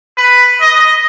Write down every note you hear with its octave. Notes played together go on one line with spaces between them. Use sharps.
B4
D#5